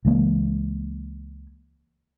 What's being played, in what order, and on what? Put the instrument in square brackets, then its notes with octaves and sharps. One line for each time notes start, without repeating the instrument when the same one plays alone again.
[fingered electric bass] C#2 E3 G#3 A#3